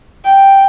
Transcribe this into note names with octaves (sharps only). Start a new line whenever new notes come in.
G5